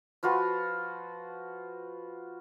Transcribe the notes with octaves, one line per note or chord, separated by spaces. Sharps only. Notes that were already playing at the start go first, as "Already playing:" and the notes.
F3 F4 F#4 B4